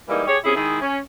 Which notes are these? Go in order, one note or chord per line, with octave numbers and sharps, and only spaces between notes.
E3 G3 G#3 A#3 D#4
G4 G#4 C#5
C3 C#4 E4 G#4
D#3 G#3 E4 G#4
C#4